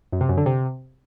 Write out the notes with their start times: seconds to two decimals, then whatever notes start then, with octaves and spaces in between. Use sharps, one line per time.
0.12 F#2
0.21 C3
0.29 F#2
0.37 D3
0.46 C3